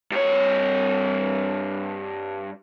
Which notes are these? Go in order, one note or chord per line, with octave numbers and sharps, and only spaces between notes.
G2 C#5